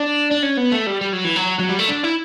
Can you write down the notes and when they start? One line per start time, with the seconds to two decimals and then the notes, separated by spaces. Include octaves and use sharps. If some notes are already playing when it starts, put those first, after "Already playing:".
Already playing: D4
0.31 D4
0.43 C#4
0.57 B3
0.72 A3
0.86 G3
1.01 G3
1.13 F#3
1.24 E3
1.36 F#3
1.60 F#3
1.69 G3
1.79 A3
1.89 D4
2.04 E4